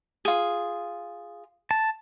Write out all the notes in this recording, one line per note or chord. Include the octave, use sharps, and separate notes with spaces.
F4 G#4
A5